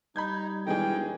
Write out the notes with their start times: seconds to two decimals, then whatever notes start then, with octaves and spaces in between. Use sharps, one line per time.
0.16 G3 D#4 B5 G6 G#6
0.67 E1 E2 D#3 E3 G#4 G5